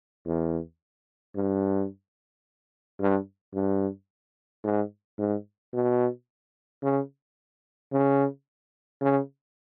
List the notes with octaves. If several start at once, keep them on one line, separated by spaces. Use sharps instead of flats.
E2
G2
G2
G2
G#2
G#2
B2
C#3
C#3
C#3